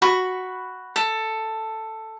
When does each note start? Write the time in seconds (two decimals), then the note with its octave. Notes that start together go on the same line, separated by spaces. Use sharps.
0.02 F#4 B5 C#6
0.96 A4